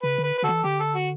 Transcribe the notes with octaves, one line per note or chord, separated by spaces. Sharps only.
C#3 B4
D3
B4
B4
D3 F#4 A4
E3
D3 G4
A4
F#4